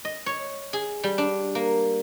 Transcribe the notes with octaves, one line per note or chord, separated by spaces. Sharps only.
D#5
C#5
G#4
G3
D4
A#3